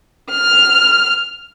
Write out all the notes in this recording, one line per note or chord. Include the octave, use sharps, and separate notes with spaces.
F6